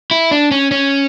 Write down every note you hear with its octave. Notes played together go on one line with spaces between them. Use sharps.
E4
D4
C#4
C#4